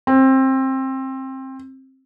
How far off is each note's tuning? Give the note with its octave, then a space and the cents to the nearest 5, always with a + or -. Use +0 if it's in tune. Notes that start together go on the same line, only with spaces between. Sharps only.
C4 +20